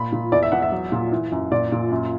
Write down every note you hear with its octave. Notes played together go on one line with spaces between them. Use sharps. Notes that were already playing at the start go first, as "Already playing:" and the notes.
Already playing: A#2 B5
A#2
E2 D5
E5
E2 F#5
E5
F#3
A#2
E3
F#2
A#2 D5
A#2
F#2